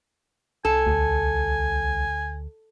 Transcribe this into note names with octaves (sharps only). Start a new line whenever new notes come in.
C2 A4 G#5
D2